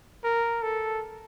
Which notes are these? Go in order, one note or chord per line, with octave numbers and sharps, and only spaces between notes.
A#4
A4